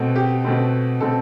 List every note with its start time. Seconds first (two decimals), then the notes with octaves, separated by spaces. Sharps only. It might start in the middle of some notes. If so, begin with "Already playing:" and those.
Already playing: B2 A3 C4
0.16 G4
0.44 B2 A3 C4
1.01 B2 A3 C4 A4